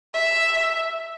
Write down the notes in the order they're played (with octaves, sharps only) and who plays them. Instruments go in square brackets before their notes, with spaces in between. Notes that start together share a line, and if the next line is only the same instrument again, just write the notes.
[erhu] E5